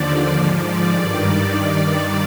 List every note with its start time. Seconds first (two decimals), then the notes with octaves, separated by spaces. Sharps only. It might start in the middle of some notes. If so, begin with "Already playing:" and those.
Already playing: D#2 D3 F3 D5
0.32 G#2 F3
0.62 D5
0.90 G2 D#3